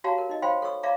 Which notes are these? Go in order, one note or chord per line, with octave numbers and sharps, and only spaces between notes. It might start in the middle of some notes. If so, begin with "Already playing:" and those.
F#4 G4 C#5 F5 A5 A#5
A#4
D#4 D#5
C5 C#5 F5 G5 B5 C6
A4 C#5 C#6 E6
C#5 D5 E5 F5 A#5 D6